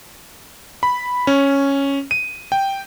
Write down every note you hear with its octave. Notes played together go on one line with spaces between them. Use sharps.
B5
C#4
D#7
G5